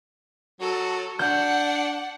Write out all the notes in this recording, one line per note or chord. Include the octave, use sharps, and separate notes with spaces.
F#3 A4
D4 F#5 G6